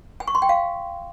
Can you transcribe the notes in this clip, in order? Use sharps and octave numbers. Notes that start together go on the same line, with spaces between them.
G#5
C#6
C6
G5
F5